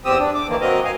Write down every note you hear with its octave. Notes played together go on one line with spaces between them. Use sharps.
E2 C4 G4 D#6 E6
D4
D6
D#3 E3 A#3
F#3 C4 A#4 D#5
D#5 F5 G#5